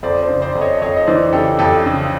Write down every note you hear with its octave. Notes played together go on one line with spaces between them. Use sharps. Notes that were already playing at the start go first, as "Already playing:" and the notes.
F2 C5 D5
C5 D5
C#3
C5 D5
F2
C#5 D#5
F2 C#5 D#5
D#5
E3 C5 D5
C#3 G4 A4
F2 G4 A4
C#3